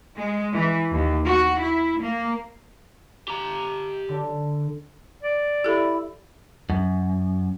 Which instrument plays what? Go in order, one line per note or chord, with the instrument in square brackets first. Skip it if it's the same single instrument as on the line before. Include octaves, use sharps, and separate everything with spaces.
[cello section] G#3
E3
D#2
F#4
E4
A#3
[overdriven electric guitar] G4 A#5
[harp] D3
[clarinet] D5
[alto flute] E4 [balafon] G4 A4
[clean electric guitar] F#2